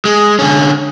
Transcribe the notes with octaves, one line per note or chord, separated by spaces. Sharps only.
G#3
D3 C#4